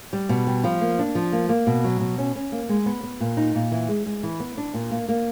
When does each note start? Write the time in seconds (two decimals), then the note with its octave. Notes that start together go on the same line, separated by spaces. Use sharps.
0.13 G3
0.29 B2
0.47 G3
0.64 F3
0.81 A#3
0.99 D4
1.15 F3
1.32 A#3
1.49 A#3
1.67 B2
1.84 F#3
2.01 B2
2.18 C#4
2.36 C#4
2.52 A#3
2.69 G#3
2.86 B3
3.03 B3
3.20 A#2
3.37 D#4
3.55 A#2
3.72 E3
3.88 G#3
4.06 G#3
4.23 E3
4.40 B3
4.57 D4
4.74 A#2
4.91 A#3
5.09 A#3